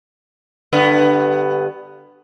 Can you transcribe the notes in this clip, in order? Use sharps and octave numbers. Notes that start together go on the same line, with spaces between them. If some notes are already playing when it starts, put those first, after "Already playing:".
G2 D3 B3